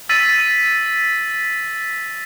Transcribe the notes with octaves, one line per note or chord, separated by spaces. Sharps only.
E6 A6 B6 D#7